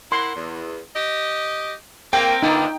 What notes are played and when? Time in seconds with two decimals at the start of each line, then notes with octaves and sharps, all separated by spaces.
0.12 E4 A#4 F#5 C6
0.36 E2
0.96 G4 D#5
2.13 A#3 C4 A#4 G5
2.43 D3 A#3 B3 D4 D#4 F4 E5